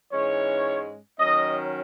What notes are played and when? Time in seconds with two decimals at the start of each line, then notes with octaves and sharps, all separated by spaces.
0.12 G#2 E3 G#3 C#4 C#5
1.19 D#3 F#3 C#4 D#5